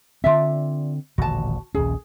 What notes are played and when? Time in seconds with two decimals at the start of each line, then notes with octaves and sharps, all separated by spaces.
0.24 D3 C4 F4 D5 E5
1.18 D#1 A1 D3 F#4 A5
1.75 A#1 D#2 C#4 G#4